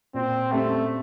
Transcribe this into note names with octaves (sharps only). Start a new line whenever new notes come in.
A#2 C4
G3 A3 C4